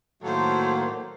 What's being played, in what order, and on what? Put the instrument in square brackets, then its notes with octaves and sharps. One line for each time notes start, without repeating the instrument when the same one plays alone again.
[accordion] A2 D#3 A#3 [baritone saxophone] F#3 [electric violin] A4 C5